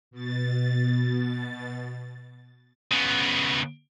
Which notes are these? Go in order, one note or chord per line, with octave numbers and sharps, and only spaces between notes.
B2 A6
C#3 B3